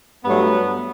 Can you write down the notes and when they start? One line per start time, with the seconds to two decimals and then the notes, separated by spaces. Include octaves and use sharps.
0.24 G2 F#3 A3 B3